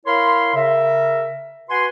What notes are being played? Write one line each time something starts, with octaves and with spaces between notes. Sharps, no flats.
E4 A#4 C#5 F5 B5 C6
C#3 A#4 E5
F#4 B4 F#5 G#5 C6